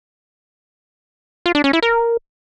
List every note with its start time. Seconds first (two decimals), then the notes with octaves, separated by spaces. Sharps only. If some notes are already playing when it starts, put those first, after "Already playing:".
1.46 F4
1.55 D4
1.64 C#4
1.73 E4
1.83 A#4